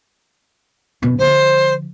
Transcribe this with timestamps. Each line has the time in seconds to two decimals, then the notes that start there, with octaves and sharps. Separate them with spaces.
1.02 F2 B2
1.19 D3 F3 C5